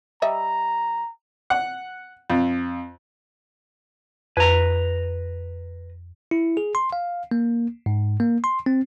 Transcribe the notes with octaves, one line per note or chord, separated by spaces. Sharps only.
G3 D#5 E5 A#5
F#5
F2
F2 B4 A#5
E4
G#4
C6
F5
A#3
G#2
A#3
C6
C4